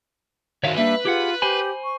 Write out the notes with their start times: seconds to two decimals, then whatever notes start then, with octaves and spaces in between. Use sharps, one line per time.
0.64 D#3 F#4 C#5 E5 F5
0.76 G3 A#3 D4 B4 E5
1.05 F4 G4 G#4 F#5
1.42 G4 C5 G#5 B5
1.84 C#6